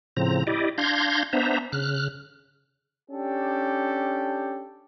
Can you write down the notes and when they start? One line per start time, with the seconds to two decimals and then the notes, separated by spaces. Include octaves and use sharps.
0.17 A2 C#3 F3 C4 A#5
0.47 E4 G4 D5 D#5
0.78 D4 F5 C6 G6 G#6 A#6
1.33 B3 D4 C5 E5 A#5
1.72 C#3 F6 F#6
3.10 C#4 D4 G4 A4